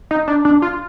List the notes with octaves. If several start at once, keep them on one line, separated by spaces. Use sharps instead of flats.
D#4
D4
D4
F4